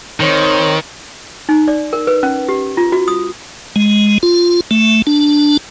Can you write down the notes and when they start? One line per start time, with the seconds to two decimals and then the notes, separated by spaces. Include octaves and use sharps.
0.20 D#3 C4 C5 C#5
1.49 D#4
1.68 D5
1.93 A#4
2.07 B4
2.23 C#4
2.49 G4
2.77 F4
2.92 F#4
3.08 D#6
3.76 G#3
4.23 F4
4.71 A3
5.07 D4